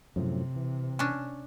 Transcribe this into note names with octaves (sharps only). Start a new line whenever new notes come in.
F#2 A2 C3 F3
E3
C#4 D4